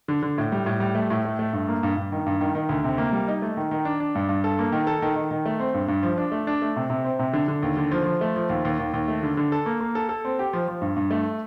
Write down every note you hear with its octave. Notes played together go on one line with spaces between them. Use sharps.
D3
D3
A2
G3
A2
G3
A3
A2
A3
A3
G2
A#3
G2
G2
D#3
G2
D#3
D#3
D2
C3
A#3
G3
D#4
A3
D#3
D#3
D4
D4
G2
G2
A4
A#3
D#3
A4
D#3
D#3
D#3
A3
C4
G2
G2
F3
D4
A3
D4
A3
C3
C3
C4
C3
D3
D3
D#2
D3
F3
F3
A3
F3
D#2
D#2
D#2
D#2
A3
D3
D3
A4
A#3
A#3
A4
A4
C4
G4
F3
F3
G2
G2
A3